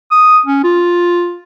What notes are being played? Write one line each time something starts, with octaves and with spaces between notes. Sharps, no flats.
D#6
C#4
F4